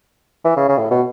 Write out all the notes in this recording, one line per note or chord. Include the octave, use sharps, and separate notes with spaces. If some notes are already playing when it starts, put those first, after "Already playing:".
E3
C#3
C#3
A2
B2